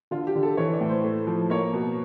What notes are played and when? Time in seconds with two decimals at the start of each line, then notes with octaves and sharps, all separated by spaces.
0.11 D3 F4
0.27 G4
0.35 D3
0.43 A4
0.57 E3 C#5
0.73 D5
0.81 A2
0.89 C5
1.04 A3
1.27 F3
1.50 A#3 C#5
1.73 B2